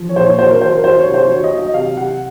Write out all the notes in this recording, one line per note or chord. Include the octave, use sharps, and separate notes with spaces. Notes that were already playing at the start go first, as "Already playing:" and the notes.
Already playing: F3
C#5
A#2 C5
C#5
F#3 C5
A#4
F#3 C5
A#4
F#3 C5
C#5
C3
C5
F#3 C#5
D#5
F#3
D#5
C3 F5
C3 F#5